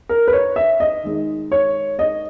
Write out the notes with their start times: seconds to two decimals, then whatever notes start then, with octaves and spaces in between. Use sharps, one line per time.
0.09 A#4
0.28 B4
0.33 C#5
0.56 E5
0.80 D#5
1.03 D#3 G#3 D#4
1.52 C#5
1.99 D#5